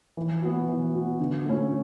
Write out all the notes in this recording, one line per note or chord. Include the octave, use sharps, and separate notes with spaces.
E3
B3 F#4
E3
B3 F#4
D3
A3 C#4